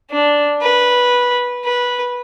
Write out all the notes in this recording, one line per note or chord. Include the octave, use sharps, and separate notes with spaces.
D4
B4
B4